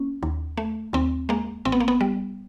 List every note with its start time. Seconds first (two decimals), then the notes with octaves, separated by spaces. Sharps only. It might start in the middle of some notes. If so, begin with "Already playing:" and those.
Already playing: A#3 C#4
0.23 D#2
0.57 A3
0.93 D#2 C4
1.29 G#3 A#3
1.65 A1 C4
1.72 B3
1.80 A#3
1.88 B3
2.01 G3